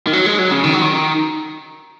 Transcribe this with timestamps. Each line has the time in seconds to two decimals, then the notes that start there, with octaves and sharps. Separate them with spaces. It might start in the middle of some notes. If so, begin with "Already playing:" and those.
0.07 D#3
0.13 F#3
0.26 G#3
0.39 F#3
0.51 C#3
0.64 D#3
0.73 F#3
0.82 D#3